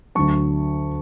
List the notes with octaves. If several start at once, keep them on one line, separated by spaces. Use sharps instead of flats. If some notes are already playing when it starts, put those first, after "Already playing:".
D2 D3 F#3 A5 C#6